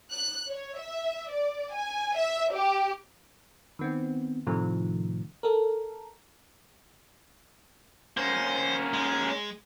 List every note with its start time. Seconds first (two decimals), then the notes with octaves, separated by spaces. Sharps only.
0.12 F#6
0.49 C#5
0.78 E5
1.30 D5
1.73 G#5
2.16 E5
2.52 G4
3.79 D#3 B3 C4
4.47 A2 C3 D#3 F3 A3
5.43 A4 A#4
8.17 A#3 C#4 C5
8.93 G#3